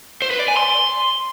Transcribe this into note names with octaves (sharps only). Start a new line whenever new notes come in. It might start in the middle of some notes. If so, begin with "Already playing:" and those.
C5
B4
D5
G#5
C6